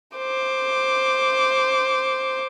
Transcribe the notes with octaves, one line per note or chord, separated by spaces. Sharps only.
C5 D6